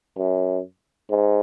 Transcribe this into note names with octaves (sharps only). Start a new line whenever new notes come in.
F#2
G#2